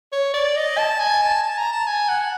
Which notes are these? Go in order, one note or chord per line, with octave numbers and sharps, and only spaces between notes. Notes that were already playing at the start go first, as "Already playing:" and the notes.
C#5
D5
D#5
A5
G#5
A5
A5
A#5
A5
G#5
F#5